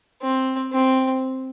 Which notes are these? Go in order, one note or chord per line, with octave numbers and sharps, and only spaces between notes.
C4
C4